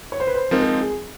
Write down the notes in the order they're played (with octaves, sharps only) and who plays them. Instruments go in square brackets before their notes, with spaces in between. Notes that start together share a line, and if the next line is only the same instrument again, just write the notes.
[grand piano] C#5
C5
B4
C5
[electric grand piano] F3 G#3 C4 D#4 [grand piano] A#4
[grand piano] A#4
G#4